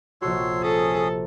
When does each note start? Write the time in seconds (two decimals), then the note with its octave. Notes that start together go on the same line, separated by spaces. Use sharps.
0.22 A#1 C3 F#4 A4 C#5 C6
0.63 C#4 G#4 A4 D#6